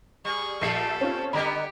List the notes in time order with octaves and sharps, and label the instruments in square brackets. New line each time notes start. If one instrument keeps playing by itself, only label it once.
[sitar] G3 [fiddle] G#4 C#6
[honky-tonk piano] A#1 C7 C#7 [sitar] A#2 G3 A3 [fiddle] A4
[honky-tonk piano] C4 C#4 F4
[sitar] D3 G3 B3 [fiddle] G4 [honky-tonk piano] D#5 A#5 B5